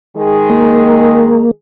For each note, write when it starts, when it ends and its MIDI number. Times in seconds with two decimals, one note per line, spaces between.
0.15 1.48 51
0.15 1.48 56
0.15 1.48 68
0.50 1.51 58